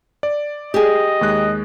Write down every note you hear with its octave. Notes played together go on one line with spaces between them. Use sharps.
D5
G4 G#4 D#5
D#2 G#3 F#6